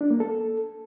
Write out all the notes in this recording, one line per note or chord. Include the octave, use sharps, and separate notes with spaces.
D4
A#3
A4